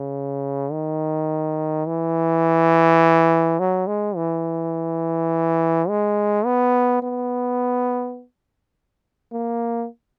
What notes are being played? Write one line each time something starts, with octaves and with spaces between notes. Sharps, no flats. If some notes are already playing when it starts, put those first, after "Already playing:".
Already playing: C#3
D#3
E3
F#3
G#3
E3
G#3
B3
B3
A#3